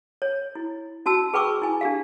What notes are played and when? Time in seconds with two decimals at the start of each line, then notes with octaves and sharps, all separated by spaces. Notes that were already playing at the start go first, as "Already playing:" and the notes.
0.22 C#5
0.55 E4
1.06 C#4 F#4 A5 E6
1.34 G#4 B4 G5 C#6 D6 E6
1.62 E4 G#5
1.81 D4 G4 F5